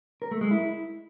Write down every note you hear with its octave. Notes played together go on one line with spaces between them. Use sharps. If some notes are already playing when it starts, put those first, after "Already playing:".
A#4
A3
G#3
E4